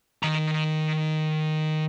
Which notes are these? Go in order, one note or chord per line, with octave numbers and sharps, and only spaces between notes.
D#3 A#5